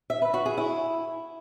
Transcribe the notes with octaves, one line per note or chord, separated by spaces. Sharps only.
E5
B4
F#4
G#4
E4